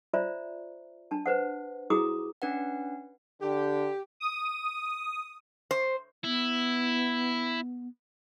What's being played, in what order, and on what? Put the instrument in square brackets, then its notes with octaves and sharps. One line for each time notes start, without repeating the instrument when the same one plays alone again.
[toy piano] F4 C5 D5 E5 A#5
D4 A5
B4 C5 F#5
E4 F#4 G#4 A#5 D6 D#6
[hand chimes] C#4 D4 B4 F#5
[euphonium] D3 [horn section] G4
[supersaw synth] D#6
[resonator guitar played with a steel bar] C5
[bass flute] B3 [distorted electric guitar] E4